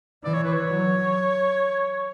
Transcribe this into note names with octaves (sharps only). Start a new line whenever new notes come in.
E3 D5
C#5
B4
C#5
F#3